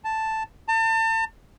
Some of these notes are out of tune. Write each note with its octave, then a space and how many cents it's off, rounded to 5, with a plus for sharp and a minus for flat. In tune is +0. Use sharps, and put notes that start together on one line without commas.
A5 +0
A5 +35